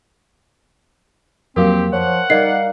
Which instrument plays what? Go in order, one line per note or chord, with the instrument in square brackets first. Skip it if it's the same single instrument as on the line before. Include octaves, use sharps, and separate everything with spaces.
[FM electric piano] F2 F#3 A#3 [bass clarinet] C4 [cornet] G4 [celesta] A#4 F5
[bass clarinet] F3 [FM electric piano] C#5 [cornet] F#5
[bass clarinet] G3 [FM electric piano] D#4 A#4 F5 [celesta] D5 D#5 C7